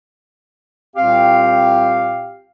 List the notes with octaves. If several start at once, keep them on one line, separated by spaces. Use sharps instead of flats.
C2 A#2 C4 G4 F5